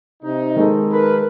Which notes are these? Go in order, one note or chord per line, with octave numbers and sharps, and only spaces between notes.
C3 D#4
D#3 G#3 A4
A#4 B4